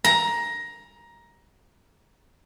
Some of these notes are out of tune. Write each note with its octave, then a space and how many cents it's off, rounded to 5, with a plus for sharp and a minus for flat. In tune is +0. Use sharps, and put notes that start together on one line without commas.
A#5 +15